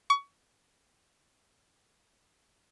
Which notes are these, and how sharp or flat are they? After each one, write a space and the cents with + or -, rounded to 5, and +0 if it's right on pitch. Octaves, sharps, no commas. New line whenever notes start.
C#6 +25